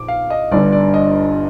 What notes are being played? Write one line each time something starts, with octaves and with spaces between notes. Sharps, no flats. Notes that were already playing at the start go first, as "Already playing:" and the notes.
Already playing: A#1 D6
F5
D#5
G1 G2 D3 D5
D5
D#5